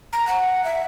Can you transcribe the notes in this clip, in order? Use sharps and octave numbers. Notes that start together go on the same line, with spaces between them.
A#5
F#5
E5